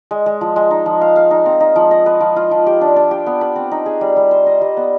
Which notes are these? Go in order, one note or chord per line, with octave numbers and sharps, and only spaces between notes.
G#3
G#3
F3
G#3
D#4
F3
F5
F5
D#4
C4
D#4
F3
D#5
B4
F3
F4
F3
G4
D4
D4
G4
B3
B4
C4
D#4
G#4
G3
G3
C5
D#5
G3
B3